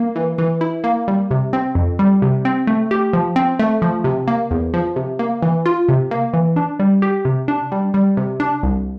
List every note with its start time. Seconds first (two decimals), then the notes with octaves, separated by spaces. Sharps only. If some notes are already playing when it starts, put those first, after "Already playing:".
Already playing: A#3
0.16 E3
0.38 E3
0.61 E4
0.84 A#3
1.08 G3
1.31 C3
1.53 C4
1.75 F2
1.99 G3
2.22 C3
2.45 C4
2.67 A3
2.91 G4
3.13 F3
3.36 C4
3.60 A3
3.82 F3
4.04 C3
4.28 A#3
4.51 E2
4.74 F3
4.96 C3
5.19 A#3
5.42 E3
5.66 F4
5.89 C3
6.11 A#3
6.34 E3
6.56 D4
6.79 G3
7.02 G4
7.25 C3
7.48 D4
7.72 G3
7.94 G3
8.17 C3
8.40 D4
8.63 C2